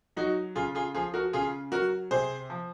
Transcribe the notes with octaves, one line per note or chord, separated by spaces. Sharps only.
F#3 D#4 F#4
C#3 F4 G#4
F4 G#4
F3 F4 G#4
F#4 A#4
C#3 F4 G#4
F#3 F#4 A#4
C3 G#4 C5
F3